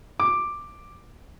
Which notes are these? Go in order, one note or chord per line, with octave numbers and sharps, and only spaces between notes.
D6